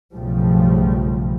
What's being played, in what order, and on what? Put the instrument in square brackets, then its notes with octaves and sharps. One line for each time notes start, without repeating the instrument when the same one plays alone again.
[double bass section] B1 G2 C#3 F3 G3 A3